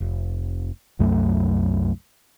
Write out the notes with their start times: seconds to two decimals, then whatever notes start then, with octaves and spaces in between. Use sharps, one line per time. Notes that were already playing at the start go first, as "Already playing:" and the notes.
0.01 F1
0.99 C2 F#2 F#3 A3